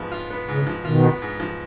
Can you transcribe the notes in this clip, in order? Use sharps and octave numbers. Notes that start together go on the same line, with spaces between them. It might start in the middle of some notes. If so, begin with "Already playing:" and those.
Already playing: G#2 F3 B3
F4
B3
G#2 C#3
F3
B2 D#3 F4
B3
G#2
F3